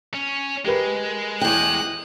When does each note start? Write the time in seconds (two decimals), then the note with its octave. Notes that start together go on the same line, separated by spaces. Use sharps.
0.14 C#4
0.65 G#3 G4 A#4 B4
1.41 E2 G5 D#6 F#6